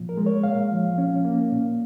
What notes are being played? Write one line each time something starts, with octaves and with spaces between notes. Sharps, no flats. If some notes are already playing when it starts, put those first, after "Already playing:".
Already playing: A#2 F3
A#4
G#3
C#5
A#2 F5
F3
C#4
A#3
A#2